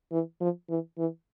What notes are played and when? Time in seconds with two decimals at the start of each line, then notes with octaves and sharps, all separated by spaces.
0.12 E3
0.41 F3
0.69 E3
0.98 E3